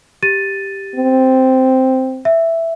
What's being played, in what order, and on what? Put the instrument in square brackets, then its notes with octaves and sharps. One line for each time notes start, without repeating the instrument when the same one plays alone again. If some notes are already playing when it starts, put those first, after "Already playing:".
[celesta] G4 A6 D#7
[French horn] C4
[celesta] E5